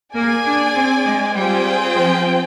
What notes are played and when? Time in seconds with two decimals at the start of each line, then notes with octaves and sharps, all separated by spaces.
0.15 A#3 G#4 D5 G#5
0.46 D4
0.76 C4
1.05 G#3
1.35 G3 C4 F4 G#4 C5 G5
1.95 F3